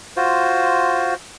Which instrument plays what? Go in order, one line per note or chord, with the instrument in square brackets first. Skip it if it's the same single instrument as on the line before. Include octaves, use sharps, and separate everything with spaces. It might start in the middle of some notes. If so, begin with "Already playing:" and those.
[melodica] F4 F#4 C5